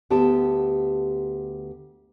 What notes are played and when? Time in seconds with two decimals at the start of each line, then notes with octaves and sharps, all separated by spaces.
0.10 D2 B3 G4 A5